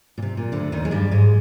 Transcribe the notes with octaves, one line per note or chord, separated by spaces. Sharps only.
A#2
C3
A#2
D2 D3
D#2 D#3
G#3
G2 G3
G#2 G#3